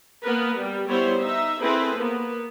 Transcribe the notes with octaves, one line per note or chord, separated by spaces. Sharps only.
A#3 B3 A#4 B4
G3
G3 B3 E4 C5 C#5
D#4 E5
C4 E4 G#4 A4 B4 C5
A#3 B3